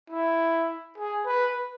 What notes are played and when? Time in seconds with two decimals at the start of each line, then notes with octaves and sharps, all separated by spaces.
0.10 E4
0.98 G#4
1.26 B4